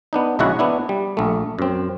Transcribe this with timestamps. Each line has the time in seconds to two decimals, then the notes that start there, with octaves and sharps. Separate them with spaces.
0.13 B3 D4 D#4
0.39 A#1 C#3 G#3 E4 F#4 F#5
0.59 B3 D4 E4
0.89 G3
1.17 A#1 A3
1.59 F#2 C4